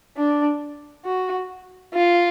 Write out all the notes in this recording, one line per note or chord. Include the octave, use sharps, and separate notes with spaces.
D4
F#4
F4